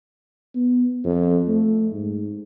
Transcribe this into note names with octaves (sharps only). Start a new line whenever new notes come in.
B3
F2
A3
G#2